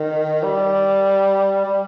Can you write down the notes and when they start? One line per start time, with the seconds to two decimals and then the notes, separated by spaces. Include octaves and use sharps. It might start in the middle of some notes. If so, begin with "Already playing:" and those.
Already playing: D#3
0.43 G3
1.65 G3